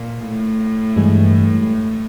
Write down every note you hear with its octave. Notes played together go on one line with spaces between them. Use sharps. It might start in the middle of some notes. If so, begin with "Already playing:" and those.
Already playing: A#2
A2
G2 E3 G#3